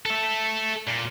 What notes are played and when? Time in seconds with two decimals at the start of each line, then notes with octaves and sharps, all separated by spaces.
0.06 A4 E5
0.87 A#2